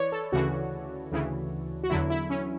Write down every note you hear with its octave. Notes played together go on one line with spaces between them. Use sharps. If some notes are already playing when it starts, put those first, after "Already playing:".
Already playing: E3 B4 C#5 D5
A4
D2 C#3 E3 F#4
D2 C#3 E3
F#4
E2 D3 F#3 E4
E4
C#4